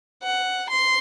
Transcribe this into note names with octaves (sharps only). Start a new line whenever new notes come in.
F#5
C6